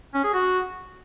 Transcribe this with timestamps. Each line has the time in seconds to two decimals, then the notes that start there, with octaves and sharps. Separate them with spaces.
0.14 C#4
0.24 G#4
0.34 F#4